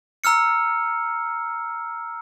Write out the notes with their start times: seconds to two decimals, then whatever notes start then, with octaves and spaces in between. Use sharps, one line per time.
0.24 A#5 E6 F6 C#7